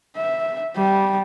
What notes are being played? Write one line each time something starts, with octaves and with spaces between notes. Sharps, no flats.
E5
G3